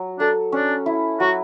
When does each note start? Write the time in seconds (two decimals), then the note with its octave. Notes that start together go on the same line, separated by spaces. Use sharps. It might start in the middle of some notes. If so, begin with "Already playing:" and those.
Already playing: F#3
0.19 D4 A4
0.52 C#4 D4
0.86 E4
1.20 F#3 F#4